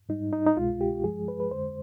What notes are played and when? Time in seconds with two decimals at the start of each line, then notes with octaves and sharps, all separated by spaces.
0.09 G#2 G3 D#4
0.33 D#4
0.46 D#4
0.57 C2 B2 G#3 F4
0.81 G4
1.04 G2 F3 G#3 G#4
1.28 B4
1.40 B4
1.51 F2 D3 G#3 C5